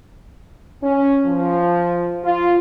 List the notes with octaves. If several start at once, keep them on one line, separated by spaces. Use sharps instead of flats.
C#4
F3
F4